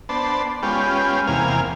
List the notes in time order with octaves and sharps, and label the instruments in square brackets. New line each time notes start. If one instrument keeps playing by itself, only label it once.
[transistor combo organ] B3 D4 C5 A5
G#3 B3 C#4 F4 G4
E2 C3 A#3 F5 G#5